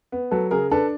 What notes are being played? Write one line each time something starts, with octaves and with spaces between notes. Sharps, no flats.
B3
F#3 A4 B4
C#3 G#4 A#4
D4 A4 B4